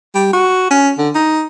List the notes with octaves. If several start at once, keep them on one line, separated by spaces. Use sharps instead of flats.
G3
F#4
C#4
D3
D#4